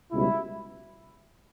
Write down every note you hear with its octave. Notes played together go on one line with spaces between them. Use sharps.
C#2 B2 G3 E4